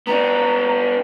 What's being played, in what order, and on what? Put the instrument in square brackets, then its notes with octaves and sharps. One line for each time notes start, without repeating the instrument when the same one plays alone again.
[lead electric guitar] B3 D4 [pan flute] A#5